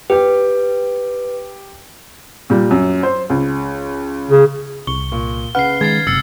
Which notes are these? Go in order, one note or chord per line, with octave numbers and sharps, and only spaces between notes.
G4 B4 G5
A#2 G3
F#2
C5
C#2
C#3
C2 C#6 G7
A#2
C#3 B4 F#5 F6 C7
D#3 G#3 G#6 A6 C7
F#1 C3 E6 A6 C#7